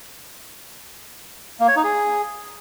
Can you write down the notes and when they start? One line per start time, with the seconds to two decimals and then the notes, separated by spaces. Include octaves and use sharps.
1.60 A#3
1.68 C#5
1.76 D#4
1.84 G#4